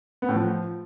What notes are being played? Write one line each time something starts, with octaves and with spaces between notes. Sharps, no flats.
B3
A2
F3